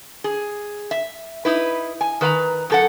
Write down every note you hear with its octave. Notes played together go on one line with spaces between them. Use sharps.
G#4
E5
D#4 E4 B4
G#5
D#3 B4 F5 A#5
F#2 A4 F#5